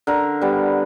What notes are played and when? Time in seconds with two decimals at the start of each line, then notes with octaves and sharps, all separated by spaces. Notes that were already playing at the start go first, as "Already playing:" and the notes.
0.07 D3 A#4
0.41 G3 B3